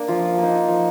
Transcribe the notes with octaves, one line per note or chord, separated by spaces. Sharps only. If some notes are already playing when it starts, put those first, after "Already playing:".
Already playing: A#3 D4
F3 F4
A#3 D#4
F3